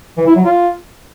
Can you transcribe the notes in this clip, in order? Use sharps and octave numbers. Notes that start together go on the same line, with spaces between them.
E3
E4
F#3
F4